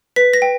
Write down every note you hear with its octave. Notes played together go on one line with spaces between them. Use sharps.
B4 B6
A#6
G5